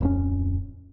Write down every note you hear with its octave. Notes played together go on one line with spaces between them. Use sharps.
D1 F2 C#4